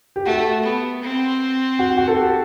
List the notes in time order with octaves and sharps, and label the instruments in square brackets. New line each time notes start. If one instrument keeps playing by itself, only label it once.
[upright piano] G4
[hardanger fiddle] A3 [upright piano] F#4
[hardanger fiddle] B3
C4
[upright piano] F#4
F#4
A4
G4